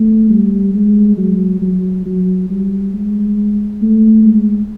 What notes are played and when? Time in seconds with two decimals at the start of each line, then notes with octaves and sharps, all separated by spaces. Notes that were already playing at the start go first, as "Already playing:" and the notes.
Already playing: A3
0.30 G3
0.74 G#3
1.17 F#3
1.61 F#3
2.05 F#3
2.50 G3
2.94 G#3
3.82 A3
4.25 G#3